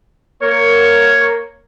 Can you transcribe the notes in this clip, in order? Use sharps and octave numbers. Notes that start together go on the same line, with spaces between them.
A#3 A#4 C#5